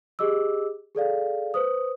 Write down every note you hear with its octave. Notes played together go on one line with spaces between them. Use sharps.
G4 G#4 D#5 D6 E6
G#4 A4 D5 F5
B4 C5 D#6